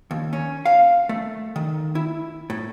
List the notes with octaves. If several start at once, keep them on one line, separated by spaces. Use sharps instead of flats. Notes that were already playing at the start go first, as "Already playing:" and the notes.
D#2
C#4
F5
A3
D#3
E4
A2